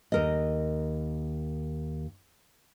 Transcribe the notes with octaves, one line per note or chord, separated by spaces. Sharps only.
D#2 A#4 D#5